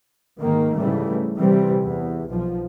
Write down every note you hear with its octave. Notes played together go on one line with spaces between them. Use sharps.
G#2 D#3 A#3
G#2 C#3 E3 G3 A3
C3 E3 G3 C4
E2
B1 F3